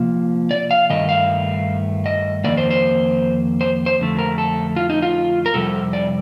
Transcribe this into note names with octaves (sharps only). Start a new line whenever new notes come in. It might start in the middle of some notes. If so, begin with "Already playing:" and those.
Already playing: C3 F3 A#3
D5
F5
G2 D#3 A3 D#5
F5
D#5
F2 D#3 A#3 D5
C5
C5
C5
C5
F2 D3 A3
A#4
A4
F4
D#4
F4
A#4
F2 C3 G3 A4
D5